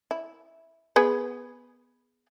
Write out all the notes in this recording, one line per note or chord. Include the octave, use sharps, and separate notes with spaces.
E4
B3 G#4 B4